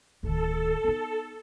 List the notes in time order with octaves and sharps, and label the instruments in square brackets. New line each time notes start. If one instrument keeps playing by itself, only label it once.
[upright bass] D1 D#3 [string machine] A4
[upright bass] B3 D#4